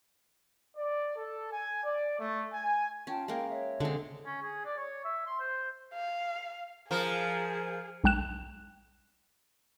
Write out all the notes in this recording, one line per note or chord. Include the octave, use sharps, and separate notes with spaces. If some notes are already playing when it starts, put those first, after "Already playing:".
D5
A4
G#5
D5
A3
G#5
C#4 F4 G5 A5
G#3 A#3 G5
C#5 E5
D3 G#3 C4
C#4
G#4
D5
C#5
E5
C6
C5
F5
F3 G#4 A#4
B1 G#3 G5 F#6 E7